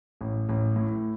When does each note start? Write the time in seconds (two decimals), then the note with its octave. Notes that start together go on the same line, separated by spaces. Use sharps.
0.21 A1
0.49 A1
0.76 A2